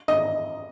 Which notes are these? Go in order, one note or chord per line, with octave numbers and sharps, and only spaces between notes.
D#5